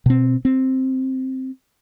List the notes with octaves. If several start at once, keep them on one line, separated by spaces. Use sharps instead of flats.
B2 C4
C4